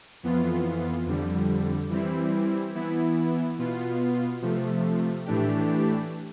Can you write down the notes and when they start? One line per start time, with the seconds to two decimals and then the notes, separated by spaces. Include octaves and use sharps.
0.23 F2 E3 B3 F4
1.06 F2 D3 G3
1.90 E3 G3 C4 E4
2.75 E3 B3 E4
3.58 B2 B3 F4
4.42 C3 F3 A3
5.25 A2 E3 A3 D4 G4